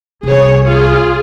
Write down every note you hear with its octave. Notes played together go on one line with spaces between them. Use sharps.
C2 G#4 C#5
F4 G#4